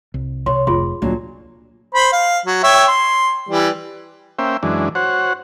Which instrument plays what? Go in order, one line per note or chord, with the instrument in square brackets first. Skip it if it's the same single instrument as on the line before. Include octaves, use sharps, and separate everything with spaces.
[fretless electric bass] C2
[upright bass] C3 [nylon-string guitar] C#5 [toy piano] C6
[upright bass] F1 [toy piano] F4 G#4 C6
[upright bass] D2 [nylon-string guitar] A#2 F#3 D4
[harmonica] C5 B5
F5
F#3
C#5 E5 G5
C6
E3 G3
[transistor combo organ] A#3 C#4 C5 E5 G5
F#2 E3 G#3 D4
F#4 C5 C#5 F#5